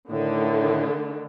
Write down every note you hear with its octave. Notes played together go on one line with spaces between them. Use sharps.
A2 D3 D#3 A3